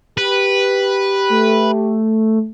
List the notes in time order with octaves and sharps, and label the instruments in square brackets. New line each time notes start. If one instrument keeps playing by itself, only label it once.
[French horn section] G4 [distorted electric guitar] B4
[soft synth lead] A3